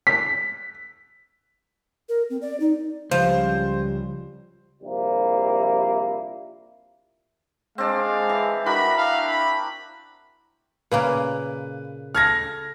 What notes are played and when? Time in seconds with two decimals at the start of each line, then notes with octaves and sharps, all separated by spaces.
0.07 B6
2.09 A#4
2.30 C4
2.42 D5
2.60 D#4
3.11 C#2 F3 G3 C5
4.83 A#1 C3 F3 G3 A#3 E4
7.78 G#3 C4 D4 D5 F5
8.29 E3
8.66 D4 E4 F#4 A#4 B5
8.98 F5
9.27 B5
10.91 A#2 C#3 A#3 B4
12.15 A4 F6 G#6 A#6